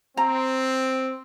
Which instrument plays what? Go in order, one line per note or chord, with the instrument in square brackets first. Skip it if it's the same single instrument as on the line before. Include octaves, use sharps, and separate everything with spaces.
[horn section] C4 [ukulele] A#5